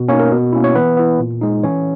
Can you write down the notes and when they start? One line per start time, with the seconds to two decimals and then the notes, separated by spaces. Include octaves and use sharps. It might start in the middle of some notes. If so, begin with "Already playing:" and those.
Already playing: B2
0.08 A#3 C#4 C#5
0.12 D#4
0.20 A#4
0.31 B2
0.52 A#3 C#4 E4
0.64 C#5
0.75 E3 B3 B4
0.97 B3 E4
1.19 A#2
1.41 G#3 D#4
1.63 E3 C#4 C#5